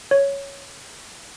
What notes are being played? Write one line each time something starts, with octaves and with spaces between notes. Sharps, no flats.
C#5